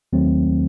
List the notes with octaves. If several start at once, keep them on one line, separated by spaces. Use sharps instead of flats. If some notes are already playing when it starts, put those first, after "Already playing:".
D#2 D#3 F#3 A3 C4